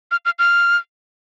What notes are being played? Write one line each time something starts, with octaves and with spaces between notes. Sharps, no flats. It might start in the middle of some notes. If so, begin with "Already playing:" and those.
F6
F6
F6